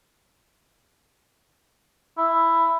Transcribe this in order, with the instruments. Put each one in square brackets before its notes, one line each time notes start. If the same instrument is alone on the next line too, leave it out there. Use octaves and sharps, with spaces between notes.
[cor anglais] E4